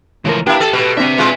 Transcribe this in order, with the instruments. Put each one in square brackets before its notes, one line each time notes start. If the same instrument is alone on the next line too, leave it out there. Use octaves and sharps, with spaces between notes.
[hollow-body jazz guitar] C#2 A2 A#4 [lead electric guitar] E3 F3
[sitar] A#3 E4 [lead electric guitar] D4 [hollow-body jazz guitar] G4
[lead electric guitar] G#4 A5 [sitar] A4
[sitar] B2 [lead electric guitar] A4 B4
[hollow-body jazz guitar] C4 D4 [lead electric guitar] G4 E5
[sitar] B2 G#3 F4